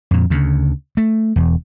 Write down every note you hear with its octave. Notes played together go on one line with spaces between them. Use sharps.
F2 A#2
D2 C#3
A3
E1 E2